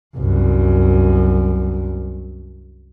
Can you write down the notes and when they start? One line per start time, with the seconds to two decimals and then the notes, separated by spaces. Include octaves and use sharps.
0.17 C2 F#2